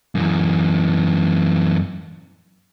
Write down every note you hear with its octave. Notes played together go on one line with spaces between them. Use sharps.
F#2 E3